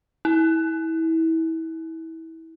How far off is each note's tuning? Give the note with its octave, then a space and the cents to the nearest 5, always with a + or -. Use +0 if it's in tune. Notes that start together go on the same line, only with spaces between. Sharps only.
E4 -30